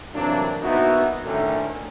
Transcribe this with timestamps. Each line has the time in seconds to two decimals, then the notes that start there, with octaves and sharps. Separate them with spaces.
0.15 C3 E3 F#3 A#3 D4
0.62 A#1 B3 D#4 E4 F#4
1.26 D2 A2 D3 D#3 A3 C#4